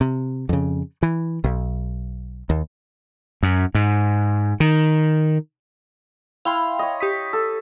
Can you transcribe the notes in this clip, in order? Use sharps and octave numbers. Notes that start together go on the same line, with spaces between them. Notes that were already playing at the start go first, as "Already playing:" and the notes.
C3
F2 C#3
E3
B1
D#2
F#2
G#2
D#3
E4 F5 G5 C6
C#5 D#5
G4 D#6 B6
A4